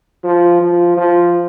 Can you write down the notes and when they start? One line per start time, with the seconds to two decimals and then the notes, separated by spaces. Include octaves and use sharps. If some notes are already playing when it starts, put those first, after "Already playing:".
0.24 F3
0.61 F3
0.97 F3